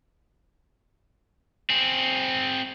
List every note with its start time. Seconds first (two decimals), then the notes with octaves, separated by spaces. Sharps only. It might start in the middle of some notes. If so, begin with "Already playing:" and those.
1.70 C4 G#4